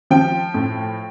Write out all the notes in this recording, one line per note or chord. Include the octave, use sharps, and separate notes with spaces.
F3 G5
A2